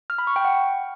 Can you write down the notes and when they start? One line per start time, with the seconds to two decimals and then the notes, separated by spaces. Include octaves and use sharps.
0.10 F6
0.18 B5
0.27 C#6
0.36 G5
0.45 F#5